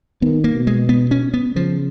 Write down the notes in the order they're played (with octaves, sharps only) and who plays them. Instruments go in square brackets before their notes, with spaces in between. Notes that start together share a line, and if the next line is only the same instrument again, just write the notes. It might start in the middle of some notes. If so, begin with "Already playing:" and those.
[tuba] D#3 [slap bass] B3
[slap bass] A#3
[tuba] B2
[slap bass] G#3
B3
C#4
B3
[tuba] C#3 [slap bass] F3